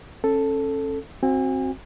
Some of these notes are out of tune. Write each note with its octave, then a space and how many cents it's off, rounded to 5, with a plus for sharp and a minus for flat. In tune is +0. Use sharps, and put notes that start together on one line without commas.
C#4 -30 A4 +0
C4 +15 F#4 -5 G#5 -40